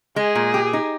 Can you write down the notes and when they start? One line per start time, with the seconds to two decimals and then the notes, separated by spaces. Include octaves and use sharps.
0.16 G#3 G#4
0.35 A#2
0.54 G4
0.73 D#4